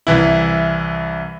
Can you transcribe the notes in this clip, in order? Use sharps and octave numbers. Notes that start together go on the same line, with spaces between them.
C2 E3 E4